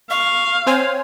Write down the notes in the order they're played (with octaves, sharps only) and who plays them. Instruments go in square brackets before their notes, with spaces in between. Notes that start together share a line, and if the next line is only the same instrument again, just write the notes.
[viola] F5 [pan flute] C#6
[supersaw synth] C4 C5 G#5 [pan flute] C#5